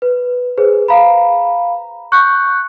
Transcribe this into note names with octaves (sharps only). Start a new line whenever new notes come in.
B4
G#4 B4 C5
F5 A#5 B5
C#6 F#6 G6 C#7